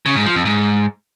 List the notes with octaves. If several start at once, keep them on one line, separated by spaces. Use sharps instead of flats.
C#3
G#2
F3
F2
G#2